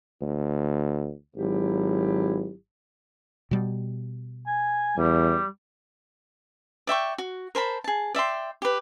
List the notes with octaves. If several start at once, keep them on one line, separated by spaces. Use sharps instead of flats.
D2
G#1 F#3 E4 G4
B2 G3
G#5
E2 G3
D5 E5 G5 C#6
F#4
A#4 C5 A5 B5
G#4 A5
D5 E5 G5 C6
G4 B4